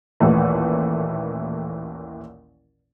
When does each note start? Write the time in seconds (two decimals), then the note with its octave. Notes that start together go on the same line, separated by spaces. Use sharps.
0.20 A1 D#2 A#2 E3 A3